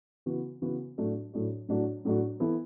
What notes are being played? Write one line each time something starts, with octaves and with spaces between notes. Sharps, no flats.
C#3 E3 B3 F#4
C#3 E3 B3 F#4
A2 F#3 A3 D4 F#4
A2 F#3 A3 D4 F#4
A2 F#3 A3 D4 F#4
A2 F#3 A3 D4 F#4
E3 B3 E4 A4